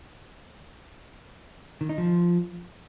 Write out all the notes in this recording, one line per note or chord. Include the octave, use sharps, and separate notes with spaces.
D#3
D#4
F3